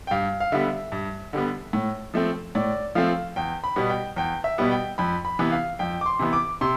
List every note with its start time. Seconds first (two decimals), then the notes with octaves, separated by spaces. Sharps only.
0.07 G5
0.11 G2 F5
0.40 F5
0.52 D3 G3 B3 E5
0.92 G2
1.33 D3 G3 B3
1.73 A2
2.14 F3 A3 C4
2.55 A2 D5
2.95 F3 A3 C4 F5
3.36 E2 G5
3.64 B5
3.76 B2 G3 B3
3.89 G5
4.16 E2 G5
4.44 E5
4.58 B2 G3 B3
4.71 G5
4.98 F2 B5
5.25 B5
5.39 C3 E3 B3
5.52 F5
5.79 F2 G5
6.01 D6
6.06 C6
6.19 C3 E3 B3
6.33 D6
6.61 C3 C6